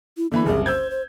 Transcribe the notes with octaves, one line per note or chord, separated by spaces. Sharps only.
E4
D3 E3 A#3 B5
F#1 C2 G#4
C5 E6 G6 G#6
C5